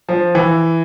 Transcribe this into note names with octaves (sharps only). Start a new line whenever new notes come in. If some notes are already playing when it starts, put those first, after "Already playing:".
F3
E3